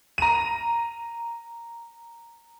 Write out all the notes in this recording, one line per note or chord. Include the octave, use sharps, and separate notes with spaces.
A#5 D#7